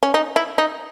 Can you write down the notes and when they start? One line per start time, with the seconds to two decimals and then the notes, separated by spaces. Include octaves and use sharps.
0.03 C#4
0.14 D#4
0.36 E4
0.58 D#4